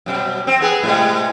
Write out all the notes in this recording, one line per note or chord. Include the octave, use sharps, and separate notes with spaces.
F#2 B2 G3
C4
B3 G#4 B4
A2 C3 G#3